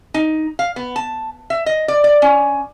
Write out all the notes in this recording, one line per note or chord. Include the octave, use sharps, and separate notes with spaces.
D#4
F5
B3
A5
E5
D#5
D5
D5
C#4